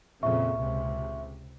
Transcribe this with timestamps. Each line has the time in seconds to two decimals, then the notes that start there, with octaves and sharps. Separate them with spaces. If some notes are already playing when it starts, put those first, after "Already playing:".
0.23 F2 A#2 C#3 E5 C#6
0.58 C#2 C3